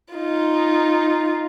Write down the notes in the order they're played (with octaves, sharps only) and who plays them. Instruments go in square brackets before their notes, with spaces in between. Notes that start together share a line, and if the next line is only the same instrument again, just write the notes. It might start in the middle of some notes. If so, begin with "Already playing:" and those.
[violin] D#4 F4